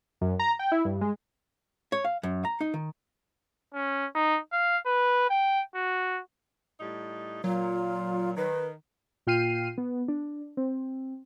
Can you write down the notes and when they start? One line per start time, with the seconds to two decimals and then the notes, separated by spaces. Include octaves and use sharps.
0.21 F#2
0.39 A#5
0.59 G5
0.72 E4
0.85 G2
1.01 G#3
1.92 C#5
2.05 F5
2.23 F#2
2.45 A#5
2.61 D#4
2.74 D#3
3.74 C#4
4.15 D#4
4.53 F5
4.86 B4
5.30 G5
5.75 F#4
6.80 A2 G3 D#4
7.44 A#2 F#3 F4
8.36 D#3 B4
9.27 A#2 F4 G5 F6 C7 D#7
9.78 B3
10.08 D4
10.57 C4